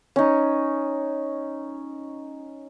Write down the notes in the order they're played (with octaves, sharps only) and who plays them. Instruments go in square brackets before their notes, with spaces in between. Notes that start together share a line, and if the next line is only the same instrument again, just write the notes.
[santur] C#4 D#4